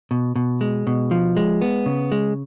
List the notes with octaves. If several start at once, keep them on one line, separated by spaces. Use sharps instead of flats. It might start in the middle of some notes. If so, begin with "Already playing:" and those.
B2
B2
G#3
B2
F3
G#3
B3
C#3
G#3